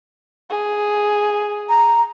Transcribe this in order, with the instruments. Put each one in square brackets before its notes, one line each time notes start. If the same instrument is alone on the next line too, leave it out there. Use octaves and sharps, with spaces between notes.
[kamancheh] G#4
[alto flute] A#5